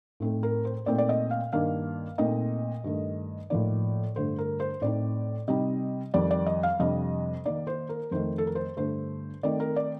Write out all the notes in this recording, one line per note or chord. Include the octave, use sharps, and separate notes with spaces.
A2 A3 C4 D#4
A#4
C5
A#2 A3 C4 D#4 D5
D5
D#5
F5
G2 D#3 A#3 D4 F5
A#2 A3 C4 D#4 D#5
G2 D#3 A3
A2 F3 A#3 D#4 D5
G2 D3 A3 C5
A#4
C5
A2 A3 C4 D#4 D5
C3 G3 C4 D#4 D#5
F2 D#3 G3 D5
D5
D#5
F5
F2 C3 G3 D4 D#5
D#3 A#3 D#4 D5
C5
A#4
F2 D#3 A3 C5
A4
A#4
C5
G2 D3 A3 C5
D#3 A3 C4 D#4 D5
A#4
D5